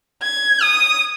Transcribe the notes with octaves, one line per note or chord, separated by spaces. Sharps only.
G#6
D#6